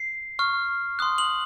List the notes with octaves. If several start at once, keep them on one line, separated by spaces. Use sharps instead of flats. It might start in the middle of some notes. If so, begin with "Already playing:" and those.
Already playing: C7
C#6 F6
C6 D#6 F#6
F#7